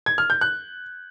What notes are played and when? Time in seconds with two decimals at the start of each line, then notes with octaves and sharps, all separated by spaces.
0.06 G#6
0.18 F6
0.30 G6
0.41 F#6